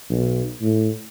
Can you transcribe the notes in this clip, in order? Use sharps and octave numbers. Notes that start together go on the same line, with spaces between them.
B1
A2